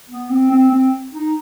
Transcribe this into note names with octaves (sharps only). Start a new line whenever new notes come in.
B3
C4
C4
C4
D#4